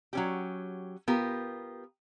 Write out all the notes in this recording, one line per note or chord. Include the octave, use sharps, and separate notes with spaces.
F#3 C#4 G4
B3 F4 G4 A#4